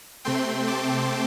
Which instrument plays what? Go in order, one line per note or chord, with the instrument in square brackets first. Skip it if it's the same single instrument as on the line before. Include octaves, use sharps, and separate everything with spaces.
[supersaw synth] C3 A3 C4 G5 C6
A5 D6